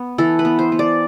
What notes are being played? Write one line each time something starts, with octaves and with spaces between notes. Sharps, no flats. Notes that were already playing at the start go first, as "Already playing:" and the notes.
Already playing: B3
E3 A4
B4
B3
C5
B3
D5